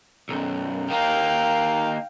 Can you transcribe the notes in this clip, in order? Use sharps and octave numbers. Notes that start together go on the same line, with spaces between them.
B1 F#2
D#3 A#3 F5 G5